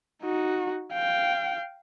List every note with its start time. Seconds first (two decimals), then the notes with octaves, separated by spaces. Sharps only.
0.23 D#4 F#4
0.92 F5 G5